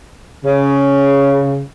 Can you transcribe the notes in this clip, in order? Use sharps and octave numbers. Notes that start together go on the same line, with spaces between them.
C#3